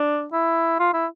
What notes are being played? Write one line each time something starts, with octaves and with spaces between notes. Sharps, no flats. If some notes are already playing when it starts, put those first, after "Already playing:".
Already playing: D4
E4
F4
E4